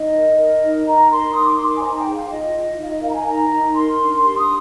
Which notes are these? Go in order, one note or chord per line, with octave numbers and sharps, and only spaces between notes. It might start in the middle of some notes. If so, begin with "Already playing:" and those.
Already playing: D#4 D#5
A#4
A#4
D#4
D#4 A#5
A#4 C6
D#4 D#6
D6
D#4 C6
D6
G#5
C5 A#5
G5
G#4
F5
F4 D#5
F4
D#4 F5
D#5
A#4 F5
A#5
G#5
D#4 A#5
D#4
A#4 C6
D4
G4 C6
D#6